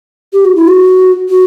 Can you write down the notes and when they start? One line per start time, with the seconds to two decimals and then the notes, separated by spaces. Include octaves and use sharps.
0.33 G4
0.45 F#4
0.56 E4
0.67 F#4
1.29 F#4